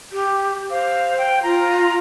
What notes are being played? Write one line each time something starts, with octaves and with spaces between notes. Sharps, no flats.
G4
C5 F5
G5
F4 A#5